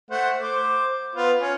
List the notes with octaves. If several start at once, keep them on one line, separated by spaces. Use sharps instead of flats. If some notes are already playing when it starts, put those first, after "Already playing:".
A3 C5 F#5
C5 D6
B3 F4 B4
C#4